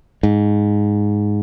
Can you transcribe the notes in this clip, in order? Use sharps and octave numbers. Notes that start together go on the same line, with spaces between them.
G#2